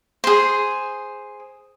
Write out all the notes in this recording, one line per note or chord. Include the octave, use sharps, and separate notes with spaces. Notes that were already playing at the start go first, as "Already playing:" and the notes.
G#4 C5